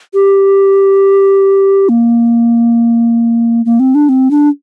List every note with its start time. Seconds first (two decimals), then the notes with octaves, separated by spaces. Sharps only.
0.14 G4
1.89 A#3
3.65 A#3
3.80 C4
3.95 D4
4.09 C4
4.31 D4